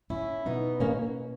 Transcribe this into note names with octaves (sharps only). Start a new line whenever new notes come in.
C#4 E4
B2 B3 D#4
A#3 C#4